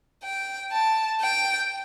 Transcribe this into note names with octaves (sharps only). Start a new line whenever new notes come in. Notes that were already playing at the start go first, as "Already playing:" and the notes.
G5
A5
G5